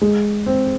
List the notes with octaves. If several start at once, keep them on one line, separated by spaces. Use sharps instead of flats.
G#3
C4